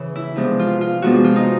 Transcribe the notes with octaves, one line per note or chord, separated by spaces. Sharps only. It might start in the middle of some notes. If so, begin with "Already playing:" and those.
Already playing: C#3 E3
E4
C3 F3 G#3 B3 D4
F4
F4
C3 F3 G#3 B3 D4 F#4
F4
D#4